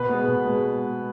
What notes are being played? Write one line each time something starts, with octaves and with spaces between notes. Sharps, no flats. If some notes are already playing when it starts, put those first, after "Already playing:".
Already playing: B2 B4
G#3 B3
B2
G#3 B3